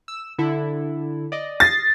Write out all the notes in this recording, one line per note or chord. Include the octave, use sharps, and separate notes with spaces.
E6
D3 E4 A4
D5 D#5
D#6 A6 A#6 C7